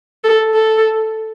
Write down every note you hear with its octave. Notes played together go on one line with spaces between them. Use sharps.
A4
A4